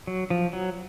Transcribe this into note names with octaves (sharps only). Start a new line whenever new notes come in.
F#3
F3
F#3